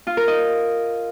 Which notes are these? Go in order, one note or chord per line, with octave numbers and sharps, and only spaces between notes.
F4
A#4
D#5